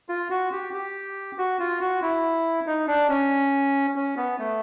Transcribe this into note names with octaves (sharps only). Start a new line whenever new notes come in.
F4
F#4
G4
G4
F#4
F4
F#4
E4
D#4
D4
C#4
C#4
B3
A3